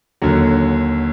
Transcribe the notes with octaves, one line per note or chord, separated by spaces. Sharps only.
D#2 D3 F#3